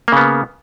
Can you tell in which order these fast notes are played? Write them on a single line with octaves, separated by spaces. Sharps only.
A#3 C#3 B3